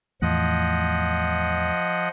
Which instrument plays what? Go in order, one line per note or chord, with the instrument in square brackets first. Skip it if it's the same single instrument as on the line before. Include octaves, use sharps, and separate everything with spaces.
[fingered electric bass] E2 A2 [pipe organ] F3 D#5 F#5